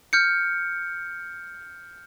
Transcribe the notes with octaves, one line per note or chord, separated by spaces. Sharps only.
F6 G6 C#7